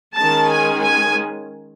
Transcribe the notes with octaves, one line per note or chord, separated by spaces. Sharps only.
D#3 G#3 C#4 A5
G#5
G#5